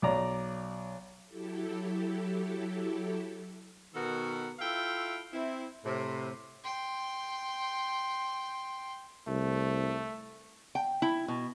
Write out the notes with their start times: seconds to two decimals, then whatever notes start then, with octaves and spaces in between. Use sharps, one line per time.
0.02 B1 D5 A#5
1.27 F#3 E4 G4 A4
3.94 B2 D#3 B3 F#4 A4 A#4
4.59 E4 F4 A4 E5 F5 G5
5.32 C4 E4
5.84 A2 C3
6.64 G5 C6
9.27 C2 A3
10.75 G5
11.02 E4
11.28 B2